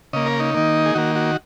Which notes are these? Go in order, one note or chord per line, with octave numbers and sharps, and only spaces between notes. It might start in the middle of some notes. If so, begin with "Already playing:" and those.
C#3 A#3 D#5
A#4
D#4
D#3 A#3
G#4
D#3 A#3 F#4
F#4